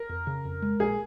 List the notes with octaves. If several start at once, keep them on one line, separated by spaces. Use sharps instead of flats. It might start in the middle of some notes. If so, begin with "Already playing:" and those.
Already playing: A#4
F2
C#3
F2
G#3
A#1 G#4